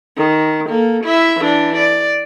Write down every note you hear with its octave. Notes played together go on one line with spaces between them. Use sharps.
D#3
A#3 A4
E4 E5
E3 D4
D5